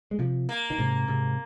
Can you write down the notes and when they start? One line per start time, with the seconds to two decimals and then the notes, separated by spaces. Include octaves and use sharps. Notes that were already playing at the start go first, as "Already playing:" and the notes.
0.11 G#3
0.19 C3 F3
0.49 A#3
0.70 D#3
0.78 G#2 C3
1.08 G#2 C3